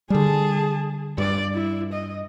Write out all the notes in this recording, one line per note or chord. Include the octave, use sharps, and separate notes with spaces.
D3 G3 G#4 A5
G2 D5
E4
D#5